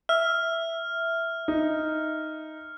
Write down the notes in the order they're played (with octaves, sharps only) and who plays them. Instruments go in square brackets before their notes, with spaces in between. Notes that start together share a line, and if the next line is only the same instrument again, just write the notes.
[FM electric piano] E5 [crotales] F6
[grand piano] D#4